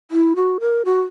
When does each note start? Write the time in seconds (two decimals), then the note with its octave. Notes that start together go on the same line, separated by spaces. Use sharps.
0.11 E4
0.36 F#4
0.60 A#4
0.85 F#4